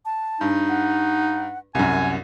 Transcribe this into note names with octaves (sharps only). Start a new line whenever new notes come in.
A5
G2 D#4
F#5
C2 F#2 F#5 G#5